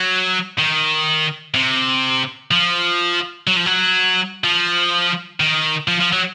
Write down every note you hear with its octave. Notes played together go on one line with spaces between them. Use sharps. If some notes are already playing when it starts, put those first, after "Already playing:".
Already playing: F#3
D#3
C3
F3
F#3
F3
F#3
F3
D#3
F3
F3
F#3